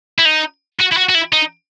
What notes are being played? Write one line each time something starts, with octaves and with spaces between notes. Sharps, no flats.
E4
D#4
F#4
E4
F#4
F#4
E4
D#4